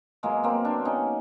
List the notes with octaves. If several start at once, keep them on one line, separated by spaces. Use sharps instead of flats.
B2 F#3 G#3 A#3
A#3 C4
C4 D4
C#4 D#4